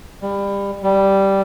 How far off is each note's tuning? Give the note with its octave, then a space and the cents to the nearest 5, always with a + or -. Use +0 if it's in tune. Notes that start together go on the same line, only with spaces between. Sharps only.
G3 +25
G3 -5